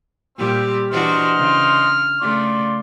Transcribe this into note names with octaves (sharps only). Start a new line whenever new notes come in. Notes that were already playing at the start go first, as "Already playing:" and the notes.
A#2 G3 C4 G4
E3 D4 F#4 C5 D#5 C6 F6
C#3
C#3 A3 F4 D5 C6